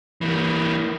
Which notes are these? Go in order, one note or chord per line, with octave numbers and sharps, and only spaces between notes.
E3 A#3